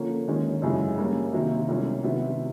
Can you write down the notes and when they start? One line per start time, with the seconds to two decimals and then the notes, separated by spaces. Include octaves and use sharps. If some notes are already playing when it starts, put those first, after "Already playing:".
Already playing: D3 F3 A#3 C#4
0.28 D#2 D#3 G#3 C#4
0.62 F#2 C#3 E3 G#3
0.98 G3 A#3 C#4
1.33 C3 D#3 F#3 A#3
1.69 C2 B2 G#3 C#4
2.04 C3 D#3 F#3 B3 E4